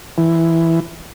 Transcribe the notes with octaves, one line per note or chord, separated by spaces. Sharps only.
E3